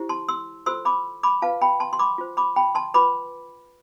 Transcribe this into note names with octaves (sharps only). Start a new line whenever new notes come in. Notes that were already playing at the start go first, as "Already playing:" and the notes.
Already playing: E4 G4 C5
A5 C6
C6 E6
F4 A4 C5 C6 E6
B5 D6
B5 D6
F4 B4 F5 A5
G5 B5
A5 C6
C6
B5 D6
F4 C5
B5 D6
G5 B5
A5 C6
F4 B4 B5 D6